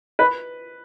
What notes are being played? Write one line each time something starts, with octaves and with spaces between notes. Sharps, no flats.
B4